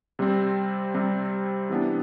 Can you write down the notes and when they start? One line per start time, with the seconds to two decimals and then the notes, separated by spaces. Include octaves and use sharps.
0.19 C3 G3 C4
0.94 C3 G3 C4
1.69 C3 E3 B3 D4